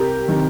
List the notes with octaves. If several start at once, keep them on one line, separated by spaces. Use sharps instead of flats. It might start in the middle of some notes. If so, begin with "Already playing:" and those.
Already playing: C2 G4 A#4
C3 D#3